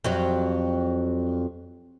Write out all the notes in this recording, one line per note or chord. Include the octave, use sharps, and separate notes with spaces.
F2 F#3 G3